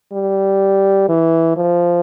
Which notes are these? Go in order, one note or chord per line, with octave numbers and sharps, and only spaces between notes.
G3
E3
F3